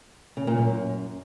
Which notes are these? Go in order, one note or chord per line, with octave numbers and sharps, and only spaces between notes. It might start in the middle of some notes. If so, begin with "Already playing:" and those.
C#3
A#2
F#2